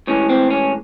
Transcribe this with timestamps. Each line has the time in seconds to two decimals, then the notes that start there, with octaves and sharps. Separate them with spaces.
0.07 A2 E3 G#3 C#4
0.29 C4
0.50 C#4